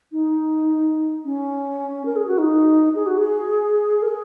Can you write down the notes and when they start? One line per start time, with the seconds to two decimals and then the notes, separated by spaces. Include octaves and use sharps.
0.12 D#4
1.25 C#4
2.05 A#4
2.16 G#4
2.27 F#4
2.38 D#4
2.95 G#4
3.06 F#4
3.18 G#4
4.02 A#4
4.08 G#4